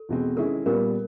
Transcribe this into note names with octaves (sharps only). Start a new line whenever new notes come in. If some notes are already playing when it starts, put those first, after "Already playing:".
Already playing: A4
E2 B2 G#3 C4
D#3 G#3 C#4 E4 A4
A#2 G3 B3 A#4